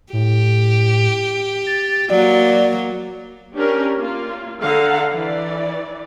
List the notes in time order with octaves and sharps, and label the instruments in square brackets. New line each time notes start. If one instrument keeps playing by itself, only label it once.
[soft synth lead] A2 [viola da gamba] G4
[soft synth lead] A6
[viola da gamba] F#3 A#3 [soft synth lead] D5
[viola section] C#4 D4 G4 A#4
A#3 F4
D3 A4 F5 F#5 A#5
E3 D5